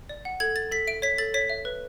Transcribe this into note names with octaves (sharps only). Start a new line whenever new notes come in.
D5
F#5
A4 G#6
A4 A6
A4 B6
E5 D7
C#5 B6
A4 A6
C#5 B6
E5
B4